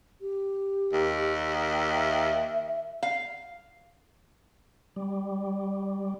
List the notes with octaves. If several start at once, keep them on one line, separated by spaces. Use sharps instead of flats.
G4
D#2
E5
F5
G3